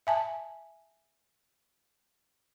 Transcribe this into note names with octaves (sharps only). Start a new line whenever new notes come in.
E5 G#5 A5